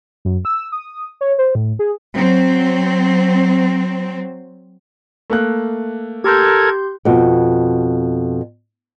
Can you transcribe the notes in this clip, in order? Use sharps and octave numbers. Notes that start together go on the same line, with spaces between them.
F#2
E6
D#6
C#5
C5
A2
G#4
F#3 C4
A3 A#3 F#6
G4 A4 A#4 C6 G6 G#6
F2 B2